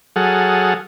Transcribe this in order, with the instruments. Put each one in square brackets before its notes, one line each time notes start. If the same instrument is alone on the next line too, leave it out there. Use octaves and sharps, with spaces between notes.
[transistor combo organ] F#3 G#4 A4 F#5 D#6 F6